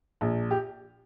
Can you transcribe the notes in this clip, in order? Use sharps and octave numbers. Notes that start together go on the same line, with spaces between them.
A#1
G4